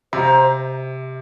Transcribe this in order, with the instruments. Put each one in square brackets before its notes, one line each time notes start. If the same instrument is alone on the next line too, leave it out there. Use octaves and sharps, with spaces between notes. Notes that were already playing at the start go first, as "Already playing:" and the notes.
[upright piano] C3 [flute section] C5 F5 A#5